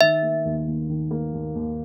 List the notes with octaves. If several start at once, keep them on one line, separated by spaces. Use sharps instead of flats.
D#3 E5
A#3
D#2
D#2
D#3
A#3
D#2
D#2